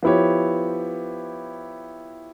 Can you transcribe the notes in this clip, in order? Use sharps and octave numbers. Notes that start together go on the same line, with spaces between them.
F3 B3 E4 G4 C#5